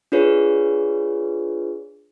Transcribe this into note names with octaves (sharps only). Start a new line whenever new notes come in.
D4 F4 G#4 B4 C#5